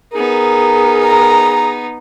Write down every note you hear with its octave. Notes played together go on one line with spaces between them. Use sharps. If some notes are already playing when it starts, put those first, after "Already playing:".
B3 D#4 G#4 A#4
A#5